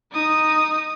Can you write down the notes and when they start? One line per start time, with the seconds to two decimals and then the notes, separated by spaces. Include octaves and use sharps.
0.12 D#4 D#6